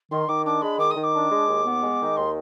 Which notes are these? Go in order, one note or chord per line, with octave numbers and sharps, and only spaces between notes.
D#3 C6
D#3 D6
D4 D6
G#3 B5
D#3 D6
D#6
D#3
D6
D4
G#3
D#2
B3
G#3
D#3
D#2 C6